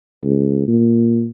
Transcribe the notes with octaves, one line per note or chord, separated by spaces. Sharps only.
C#2
A#2